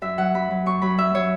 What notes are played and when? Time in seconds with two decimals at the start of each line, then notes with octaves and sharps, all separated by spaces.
0.02 F#2 E5
0.18 F#3 F#5
0.34 F#2 B5
0.51 F#3
0.66 F#2 C#6
0.82 F#3 B5
0.98 F#2 E5
1.14 F#3 C#5